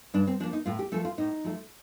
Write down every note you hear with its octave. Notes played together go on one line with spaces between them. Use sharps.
G2 D4
C4
F3 A#3 D4
D#4
A2 F4
G4
F3 A3 A4
F4
A2 D#4
F3 A3